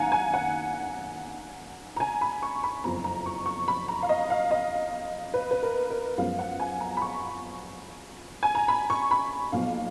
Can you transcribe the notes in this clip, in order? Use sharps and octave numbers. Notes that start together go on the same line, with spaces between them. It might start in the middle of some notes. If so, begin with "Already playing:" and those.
Already playing: F#2 D#3 A#3 F5 F#5 G#5 A#5
G#5
F#5
A#5
G#5
B5
C#6
B5
F#1 F2 F3 B3 A#5
A#5
C#6
C#6
B5
A#5
F5
D#5
F5
D#5
B4
B4
A#4
A#4
F#2 F3 G#3 B3 F5
F#5
G#5
A#5
B5
C#6
G#5
A#5
B5
C#6
B5
B1 A#2 F3 B3 F5